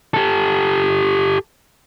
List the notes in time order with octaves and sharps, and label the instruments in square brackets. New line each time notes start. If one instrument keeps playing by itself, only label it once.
[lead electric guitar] G4 A4